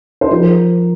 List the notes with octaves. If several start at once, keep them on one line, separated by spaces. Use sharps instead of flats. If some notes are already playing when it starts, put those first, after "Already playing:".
C5
F3 A#4